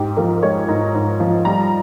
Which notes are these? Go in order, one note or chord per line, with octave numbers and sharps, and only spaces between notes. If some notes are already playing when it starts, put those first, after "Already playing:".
Already playing: G#2 G4
F3 A#4
G#3 C#5
G#2 A#5
G#2
F3
G3 A#5